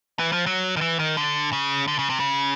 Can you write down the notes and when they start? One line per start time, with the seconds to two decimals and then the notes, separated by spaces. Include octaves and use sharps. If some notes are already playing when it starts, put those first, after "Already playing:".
0.19 E3
0.32 F3
0.46 F#3
0.76 D#3
0.81 E3
0.99 D#3
1.17 D3
1.53 C#3
1.88 D3
1.99 C#3
2.10 C3
2.20 C#3